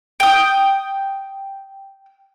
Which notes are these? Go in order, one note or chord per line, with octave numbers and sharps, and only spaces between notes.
G5 D#6